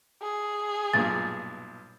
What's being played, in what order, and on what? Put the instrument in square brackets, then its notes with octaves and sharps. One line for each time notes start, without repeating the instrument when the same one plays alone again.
[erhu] G#4
[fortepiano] B1 G2 A#2 [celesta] A6